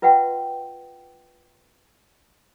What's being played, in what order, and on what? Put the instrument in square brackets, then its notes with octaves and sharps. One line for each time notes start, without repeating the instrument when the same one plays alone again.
[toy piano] F4 B4 E5 F#5 G5 C6